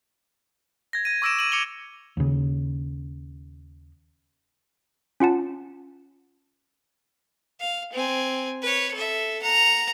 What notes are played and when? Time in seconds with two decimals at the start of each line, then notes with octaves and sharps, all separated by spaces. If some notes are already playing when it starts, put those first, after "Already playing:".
0.93 G#6 A#6
1.05 G#6 D#7
1.22 C#6 D6 E6 A#6 D7 E7
1.39 D#7 F#7
1.52 D6 C#7 D7 F7 G7
2.17 D#2 C#3
5.20 C#4 F4 F#5 A5
7.60 F5
7.93 C4 G#5
8.62 B4 C#5
8.94 A4 E5
9.41 F#5 A#5